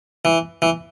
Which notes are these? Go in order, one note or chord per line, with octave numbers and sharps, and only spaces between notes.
E3
E3